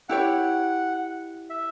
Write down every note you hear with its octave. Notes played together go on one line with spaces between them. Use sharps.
E4 G4 C#5 F#5
E5